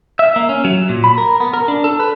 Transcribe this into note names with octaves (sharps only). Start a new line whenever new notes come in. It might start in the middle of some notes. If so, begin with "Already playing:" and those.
E5
A#3
C#4
F#3
A#2
B5
A#4
B3
A#4
D4
A4
B4